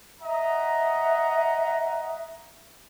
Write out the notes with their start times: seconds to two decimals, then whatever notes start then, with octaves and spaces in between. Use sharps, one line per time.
0.21 D#5 E5 F#5 A#5